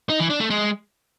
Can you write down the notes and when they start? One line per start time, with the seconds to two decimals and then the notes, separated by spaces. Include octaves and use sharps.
0.09 D#4
0.20 E3
0.30 D4
0.40 A3
0.50 G#3